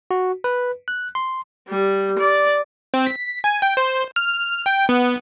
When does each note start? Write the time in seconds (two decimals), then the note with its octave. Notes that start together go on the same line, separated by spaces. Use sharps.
0.11 F#4
0.44 B4
0.88 F#6
1.15 C6
1.69 G3
2.19 D5
2.94 C4
3.06 B6
3.44 G#5
3.62 G5
3.77 C5
4.16 F6
4.66 G5
4.89 B3